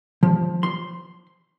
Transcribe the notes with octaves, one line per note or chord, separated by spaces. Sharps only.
F3
C6